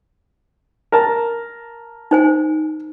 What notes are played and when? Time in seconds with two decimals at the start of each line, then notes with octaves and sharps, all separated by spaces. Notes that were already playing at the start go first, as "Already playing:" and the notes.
0.92 A#4 A5
2.11 D#4 C5 G#5